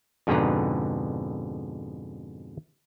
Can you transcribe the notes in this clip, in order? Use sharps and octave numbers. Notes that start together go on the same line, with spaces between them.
F2 G#2 B2 D3 B4 A#5